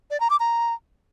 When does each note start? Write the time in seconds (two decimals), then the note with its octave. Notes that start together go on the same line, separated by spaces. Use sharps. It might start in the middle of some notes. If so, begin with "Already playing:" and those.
0.11 D5
0.20 A#5
0.30 D6
0.40 A#5